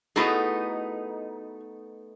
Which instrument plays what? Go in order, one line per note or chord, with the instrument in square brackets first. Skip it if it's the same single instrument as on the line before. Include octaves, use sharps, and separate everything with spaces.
[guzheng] A3 B3 D#4 [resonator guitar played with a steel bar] E4 F#4 G#4